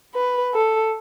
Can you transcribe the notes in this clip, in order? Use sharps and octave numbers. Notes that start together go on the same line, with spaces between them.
B4
A4